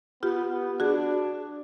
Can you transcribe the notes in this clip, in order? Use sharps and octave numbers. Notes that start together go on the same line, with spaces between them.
B3 F4 G4
B3
D4 F#4 G#4